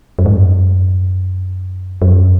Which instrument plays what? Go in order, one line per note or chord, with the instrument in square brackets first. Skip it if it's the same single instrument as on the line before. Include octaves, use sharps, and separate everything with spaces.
[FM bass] F#2
G#2
F#2
F#2